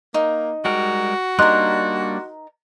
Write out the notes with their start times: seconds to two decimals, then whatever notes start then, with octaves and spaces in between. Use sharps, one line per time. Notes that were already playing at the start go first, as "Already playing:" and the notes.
0.14 A#3 D#4
0.65 G3 G#3 F#4 A#4
1.39 G3 A#3 D4 D#4 A#4 C6 F#6